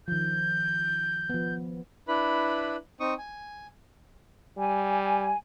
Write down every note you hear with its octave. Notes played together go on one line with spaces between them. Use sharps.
D#3 F3 G6
F3 B3
D4 E4 B4 B5
C4 D#4 C#6 D#6
G#5
G3 G#5